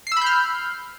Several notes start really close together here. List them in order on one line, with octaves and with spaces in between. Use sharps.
C7 E6 B5 G6 F6